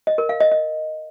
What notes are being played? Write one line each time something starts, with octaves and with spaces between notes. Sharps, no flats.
D#5
A#4
F5
D#5
D#5